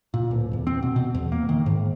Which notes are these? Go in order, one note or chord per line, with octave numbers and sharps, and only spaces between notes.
A#2
D1
E2
C4
B2
B2
E2
A#3
D#3
G#2